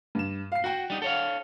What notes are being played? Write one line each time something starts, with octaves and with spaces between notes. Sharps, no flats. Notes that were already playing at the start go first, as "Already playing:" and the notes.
G2 E7
F5 C7
F#4 F#5 G5
G3 D#4
A4 C#5 F5